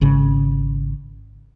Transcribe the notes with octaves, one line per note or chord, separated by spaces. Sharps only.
G#1 C#3